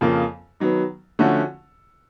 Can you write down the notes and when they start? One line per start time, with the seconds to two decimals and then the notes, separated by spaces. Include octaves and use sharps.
0.01 F2 C#3 F3 A#3
0.60 D#3 F#3 B3
1.19 D3 F3 A3 C#4 F#4